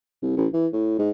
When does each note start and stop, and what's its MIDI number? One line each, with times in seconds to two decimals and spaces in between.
0.22 0.33 36
0.37 0.47 33
0.53 0.67 52
0.73 0.97 45
0.99 1.10 44